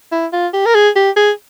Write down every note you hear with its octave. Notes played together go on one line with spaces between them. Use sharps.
E4
F4
G4
A#4
G#4
G4
G#4